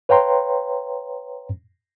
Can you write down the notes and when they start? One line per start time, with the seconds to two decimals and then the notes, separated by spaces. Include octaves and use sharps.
0.09 B4 C#5 F5 G5 A#5 C6